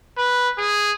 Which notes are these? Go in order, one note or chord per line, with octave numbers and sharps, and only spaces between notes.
B4
G#4